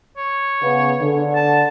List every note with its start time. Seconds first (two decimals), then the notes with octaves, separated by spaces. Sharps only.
0.17 C#5
0.62 C#3 B3
1.01 D3
1.35 A5